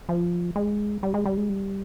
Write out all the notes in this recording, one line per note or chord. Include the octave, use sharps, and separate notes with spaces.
F3
G#3
G3
G#3
G3
G#3
G3